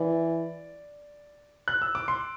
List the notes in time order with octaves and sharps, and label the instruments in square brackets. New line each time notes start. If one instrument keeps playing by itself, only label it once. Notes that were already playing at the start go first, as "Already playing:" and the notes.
Already playing: [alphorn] E3 [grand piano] D5
[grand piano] F#6
E6
D6
C6